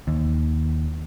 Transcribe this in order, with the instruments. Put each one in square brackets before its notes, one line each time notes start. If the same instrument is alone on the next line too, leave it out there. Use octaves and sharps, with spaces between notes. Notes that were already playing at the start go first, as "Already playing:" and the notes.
[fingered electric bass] D#2